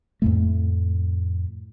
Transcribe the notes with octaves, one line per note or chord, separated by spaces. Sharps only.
F2 A2 A3